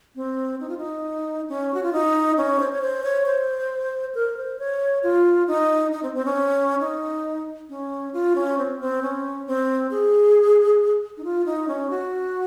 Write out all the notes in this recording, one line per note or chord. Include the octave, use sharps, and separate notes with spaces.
C4
D#4
F4
D#4
C#4
F#4
F4
D#4
C#4
C5
C#5
C5
C#5
C5
A#4
C5
C#5
F4
D#4
D#4
C4
C4
C#4
D#4
C#4
F4
C#4
C4
C4
C#4
C4
G#4
D#4
F4
D#4
C#4
F#4